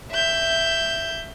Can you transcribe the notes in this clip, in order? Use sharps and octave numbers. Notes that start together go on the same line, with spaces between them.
E5 G6